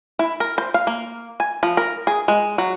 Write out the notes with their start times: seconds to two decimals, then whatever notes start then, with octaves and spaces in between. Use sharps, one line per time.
0.19 E4
0.40 A#4
0.58 C5
0.74 F5
0.87 A#3
1.40 G#5
1.63 F3
1.77 A#4
2.07 G#4
2.28 G#3
2.58 F#3